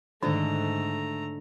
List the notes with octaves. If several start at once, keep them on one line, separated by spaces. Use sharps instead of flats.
G#2 D3 D#3 A3 D4 D#5 A#5